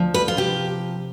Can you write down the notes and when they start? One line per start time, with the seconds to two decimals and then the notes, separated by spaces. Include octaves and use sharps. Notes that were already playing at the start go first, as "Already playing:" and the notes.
Already playing: D2 F3
0.14 B4
0.28 F4
0.37 C3 G4